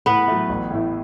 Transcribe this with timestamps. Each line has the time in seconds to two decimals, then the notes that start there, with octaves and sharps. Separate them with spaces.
0.06 A2 B3 B4
0.28 F#3 A3
0.49 A1
0.71 A2 A3 E4